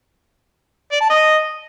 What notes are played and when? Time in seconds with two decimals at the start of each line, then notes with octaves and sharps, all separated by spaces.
0.92 D5
1.01 A5
1.10 D#5